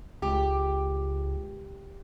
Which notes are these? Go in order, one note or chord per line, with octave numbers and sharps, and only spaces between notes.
C#2 G4